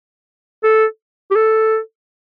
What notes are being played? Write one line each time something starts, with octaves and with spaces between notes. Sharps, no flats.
A4
G4
A4